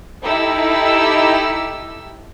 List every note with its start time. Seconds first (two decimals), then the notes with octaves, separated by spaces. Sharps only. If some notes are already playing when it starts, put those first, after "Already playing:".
0.24 D#4 E4 G4 A4 E6